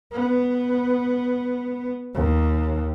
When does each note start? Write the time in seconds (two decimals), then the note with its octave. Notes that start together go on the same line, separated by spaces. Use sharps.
0.12 B3
2.15 D#2